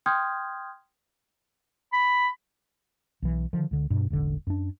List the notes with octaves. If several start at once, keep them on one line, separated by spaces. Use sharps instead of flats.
G5 C6 D#6 F6 G6 G#6
B5
B1 E3
D3 D#3 F3
C#2 D3
G2 B2
E1 A1 D3
F#2 D4